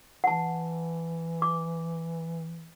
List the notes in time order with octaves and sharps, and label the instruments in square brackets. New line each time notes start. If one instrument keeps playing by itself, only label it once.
[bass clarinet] E3 [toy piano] F#5 A5
[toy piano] D6